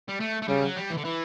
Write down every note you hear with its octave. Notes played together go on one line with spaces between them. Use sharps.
G3
A3
A3
C#3 G3
F#3
G3
E3
D3
E3